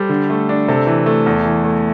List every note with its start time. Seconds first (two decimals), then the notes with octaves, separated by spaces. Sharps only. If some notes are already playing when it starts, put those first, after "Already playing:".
Already playing: G3 A4 C5
0.09 D3
0.30 A3
0.49 D4
0.68 C3 A4
0.87 E3
1.06 A3
1.26 E2
1.45 E3
1.65 A3